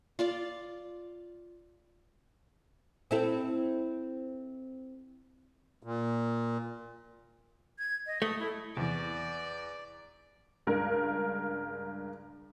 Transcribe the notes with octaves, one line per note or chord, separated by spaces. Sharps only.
F4 D5 F5
C4 E4 A4
A#2
G#6
D#5
A3 D#6
E4
E2 C3 E3 D5
C#2 G2 A#4